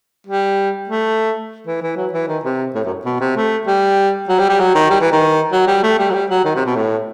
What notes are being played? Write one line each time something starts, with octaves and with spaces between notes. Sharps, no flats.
G3
A3
E3
E3
F#3
E3
D#3
C3
A2
F#2
B2
C3
A3
G3
F#3
G3
G3
F#3
D#3
G3
E3
D#3
F#3
G3
A3
G3
F#3
G3
F#3
D#3
C3
B2
A2